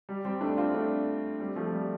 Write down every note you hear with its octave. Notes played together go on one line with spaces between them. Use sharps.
G3
G3 C4
A3 D4
C4 F4
A3 D4
G3 C4
F3 A3
G3